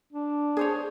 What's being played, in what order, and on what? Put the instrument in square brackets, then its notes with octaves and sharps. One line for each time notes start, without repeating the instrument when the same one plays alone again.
[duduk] D4
[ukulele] G#4 C5 C#5